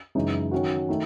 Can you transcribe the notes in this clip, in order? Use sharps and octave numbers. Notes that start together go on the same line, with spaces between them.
F#2 C#3 E3 G#3 D#4
D#3 F#3 C#4 F#4
D#3 A3 D#4